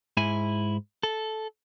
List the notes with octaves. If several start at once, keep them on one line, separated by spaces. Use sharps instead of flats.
G#2 E4 G#5
A4